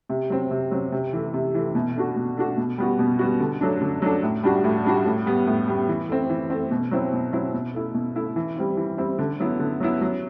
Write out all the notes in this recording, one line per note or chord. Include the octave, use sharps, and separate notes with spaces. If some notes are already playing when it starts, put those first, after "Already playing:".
C3
F#3 C4
C3
F#3 C4
C3
E3 A3
C3
E3 A3
B2
A3 D4 F#4
B2
A3 D4 F#4
B2
G3 B3 F#4
B2
G3 B3 F#4
D3
F#3 A3 D4
D3
F#3 A3 D4
A2
G3 D4 F#4
A2
G3 D4 F#4
A2
G3 B3
A2
G3 B3
E3
A3 C4
E3
A3 C4
B2
F#3 C4 E4
B2
F#3 C4 E4
B2
A3 E4
B2
A3 E4
E3
G3 C4 E4
E3
G3 C4 E4
D3
F#3 B3 E4
D3
F#3 B3 E4
F#3